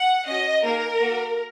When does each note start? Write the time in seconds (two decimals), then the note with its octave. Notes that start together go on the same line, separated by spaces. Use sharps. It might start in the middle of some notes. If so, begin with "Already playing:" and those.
Already playing: F#5
0.26 C#4 F#4 D#5
0.62 A#3 D#4 G#4 A#4
0.99 A#3 F#4